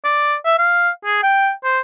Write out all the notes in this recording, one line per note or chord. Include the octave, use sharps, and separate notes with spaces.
D5
E5
F5
G#4
G5
C5